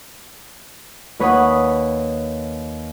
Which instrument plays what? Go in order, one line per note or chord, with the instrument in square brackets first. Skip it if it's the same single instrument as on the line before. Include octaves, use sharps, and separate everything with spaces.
[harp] D#2 B4 C#5 F#5 D#6